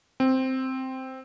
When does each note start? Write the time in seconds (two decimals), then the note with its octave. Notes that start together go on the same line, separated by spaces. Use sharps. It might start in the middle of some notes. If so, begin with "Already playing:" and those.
0.20 C4